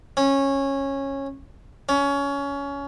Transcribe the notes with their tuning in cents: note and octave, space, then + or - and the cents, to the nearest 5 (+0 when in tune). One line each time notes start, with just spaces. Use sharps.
C#4 -15
C#4 +20